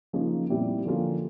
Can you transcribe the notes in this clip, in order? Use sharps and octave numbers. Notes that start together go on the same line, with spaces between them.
C#3 F3 A#3 D#4
A#2 G3 C4 E4 G4
D3 F3 A#3 C#4 F4